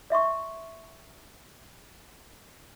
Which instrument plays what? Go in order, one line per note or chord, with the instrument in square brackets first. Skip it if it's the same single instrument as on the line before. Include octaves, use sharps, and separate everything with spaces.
[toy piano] D5 E5 C6 C#6